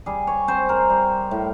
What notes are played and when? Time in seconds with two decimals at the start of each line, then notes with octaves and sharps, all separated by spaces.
0.06 G3 G#4
0.27 C#5
0.48 C4 C5
0.69 A#4
0.90 G3
1.31 A2